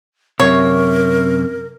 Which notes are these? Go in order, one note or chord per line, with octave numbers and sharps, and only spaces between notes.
F#2 C3 A#4 C#5